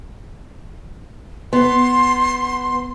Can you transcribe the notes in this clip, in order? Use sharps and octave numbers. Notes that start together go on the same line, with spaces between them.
B3 C6